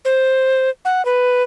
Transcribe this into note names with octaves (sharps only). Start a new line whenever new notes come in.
C5
F#5
B4